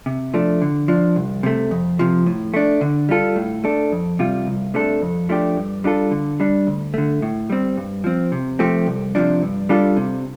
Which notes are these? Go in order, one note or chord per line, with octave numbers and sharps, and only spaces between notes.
C3
F3 A3 D4
D3
F3 D4
C2
C3 A3
F2
C3 F3
A2
A3 D4
D3
G3 F4 A4
A2
A3 D4 A4
F2
C3 G3 F4
C2
C3 A3 D4 A4
F2
F3 A3 D4 G4
G2
G3 D4 F4 A4
D3
G3 D4
D2
D3 A3
A2
G3 C4
G2
F3 C4
C3
F3 A3 C4 G4
C2
C3 F3 D4
G2
G3 D4 F4 A4
C3